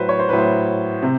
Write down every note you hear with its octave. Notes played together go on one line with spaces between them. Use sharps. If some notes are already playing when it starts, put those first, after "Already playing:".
Already playing: A2 F#3 B4 C5
C#5
C5
A2 F#3 B4
C5
C3